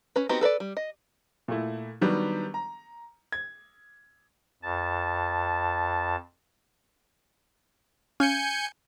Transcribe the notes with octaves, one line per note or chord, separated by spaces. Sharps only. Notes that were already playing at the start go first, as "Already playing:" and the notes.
C#4 B4
B3 C4 D#4 F#4 G4
A4 B4 C#5 D5
G3
D#5
A#2 A3 E4
D#3 F#3 G3 B3 D4
A#5
G#6
F2 A5
C#4 F5 G#5 G6 C#7